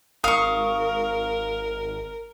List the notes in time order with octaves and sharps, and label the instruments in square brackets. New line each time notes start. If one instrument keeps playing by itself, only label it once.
[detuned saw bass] G#1 [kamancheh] A#4 [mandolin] F5 C#6 [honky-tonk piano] D#6